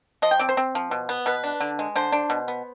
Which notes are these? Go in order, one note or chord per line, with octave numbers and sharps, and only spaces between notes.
F3 D#5
G5
C4 D5
C5
C4
F3
B2
B3
B2 B4
D4
D3
G#3
D3 C5
D4
B2
B3